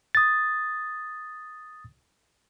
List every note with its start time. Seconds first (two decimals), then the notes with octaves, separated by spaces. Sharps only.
0.15 D#6 A6